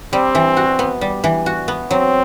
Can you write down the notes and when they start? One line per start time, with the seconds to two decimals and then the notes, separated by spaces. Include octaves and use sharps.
0.13 G3 C4
0.35 E3
0.57 F#4
0.79 B3
1.01 G3
1.24 E3
1.46 F#4
1.68 B3
1.91 F#3 C4